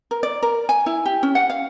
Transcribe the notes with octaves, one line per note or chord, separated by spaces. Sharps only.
A#4
D5
A#4
G#5
E4
G4
C#4
F#5
F5